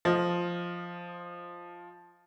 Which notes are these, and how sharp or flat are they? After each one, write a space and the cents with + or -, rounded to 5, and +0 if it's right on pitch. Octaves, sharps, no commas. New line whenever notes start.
F3 +0 D#5 +0